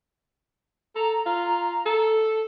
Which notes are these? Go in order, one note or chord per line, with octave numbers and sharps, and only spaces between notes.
A4 A#5
F4
A4